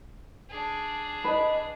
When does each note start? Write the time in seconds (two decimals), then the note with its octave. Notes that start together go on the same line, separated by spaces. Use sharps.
0.50 D4 G#4
1.24 B4 D#5